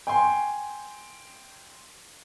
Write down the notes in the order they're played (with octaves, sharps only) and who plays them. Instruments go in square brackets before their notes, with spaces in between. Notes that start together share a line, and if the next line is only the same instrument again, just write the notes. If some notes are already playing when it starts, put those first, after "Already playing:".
[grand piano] G5 G#5 C6